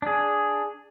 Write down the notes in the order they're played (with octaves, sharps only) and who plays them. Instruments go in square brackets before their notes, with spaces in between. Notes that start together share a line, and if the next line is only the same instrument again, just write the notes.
[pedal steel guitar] D4 G#4